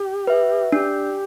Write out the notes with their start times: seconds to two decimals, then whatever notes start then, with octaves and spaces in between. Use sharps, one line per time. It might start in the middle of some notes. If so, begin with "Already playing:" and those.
Already playing: G4
0.27 B4 E5
0.72 D4 G4